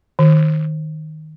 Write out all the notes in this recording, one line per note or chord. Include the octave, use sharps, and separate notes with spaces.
D#3